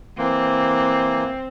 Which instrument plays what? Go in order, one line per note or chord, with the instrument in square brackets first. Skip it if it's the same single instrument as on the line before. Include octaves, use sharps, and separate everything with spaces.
[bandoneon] E3 A#3 [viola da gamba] C4